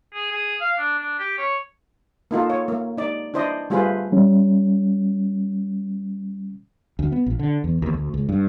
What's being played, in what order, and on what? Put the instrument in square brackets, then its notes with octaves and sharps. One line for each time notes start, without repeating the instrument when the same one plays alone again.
[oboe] G#4
G#4
F5
D4
D4
G4
C#5
[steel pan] A#3 D#4 F4 A4
C#5
A#3
D#4 D5
D4 E4 C5 D5 D#5
G3 A3 F4 G#4 B4 C5
[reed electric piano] G3 C#4
[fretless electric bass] D2
B3
A#1
D3
E2
D#2
D2
C#2
G2